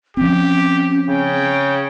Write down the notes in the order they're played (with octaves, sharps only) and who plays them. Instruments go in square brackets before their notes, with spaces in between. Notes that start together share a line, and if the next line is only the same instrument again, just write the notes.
[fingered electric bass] F3 C4 [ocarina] C#4 [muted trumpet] G4
[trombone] C#3 [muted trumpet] G5